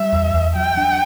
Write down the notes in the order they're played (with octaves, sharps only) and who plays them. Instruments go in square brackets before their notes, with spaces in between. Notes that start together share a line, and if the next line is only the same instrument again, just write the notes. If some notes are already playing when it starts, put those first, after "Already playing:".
Already playing: [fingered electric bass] G3 [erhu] E5
[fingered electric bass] E2
E2
[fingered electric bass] F#3 [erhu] G5
[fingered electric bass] D4